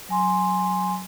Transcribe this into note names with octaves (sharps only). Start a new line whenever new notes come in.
F#3 G#5 C6